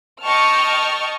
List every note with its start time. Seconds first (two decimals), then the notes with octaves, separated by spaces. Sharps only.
0.24 D#5 G5 A5 C#6 F6